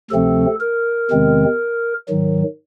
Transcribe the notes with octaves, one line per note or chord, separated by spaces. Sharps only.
D2 C3 F3 A3 C4 A4
A#4
E2 C3 D#3 G#3 C4
G#2 D#3 F#3